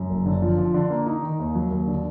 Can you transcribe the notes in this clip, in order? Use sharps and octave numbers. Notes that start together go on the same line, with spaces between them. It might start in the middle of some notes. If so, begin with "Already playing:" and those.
Already playing: F#2
F#1
D3
F3
F3
D3
A#3
D#4
D#3
D#2
F#3
D#2
D3